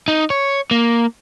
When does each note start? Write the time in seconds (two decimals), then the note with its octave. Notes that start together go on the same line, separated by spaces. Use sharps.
0.08 D#4
0.30 C#5
0.71 A#3